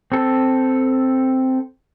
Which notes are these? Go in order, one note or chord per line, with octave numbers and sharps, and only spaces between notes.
C4 A4